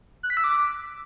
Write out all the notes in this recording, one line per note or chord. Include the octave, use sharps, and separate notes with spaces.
F#6
B6
E6
D6